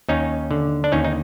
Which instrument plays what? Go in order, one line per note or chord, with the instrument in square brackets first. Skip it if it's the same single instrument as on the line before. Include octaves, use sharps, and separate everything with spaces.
[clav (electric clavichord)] D#2 C#4 D#4
D3
D4
D#2 C#4 D#4
D#4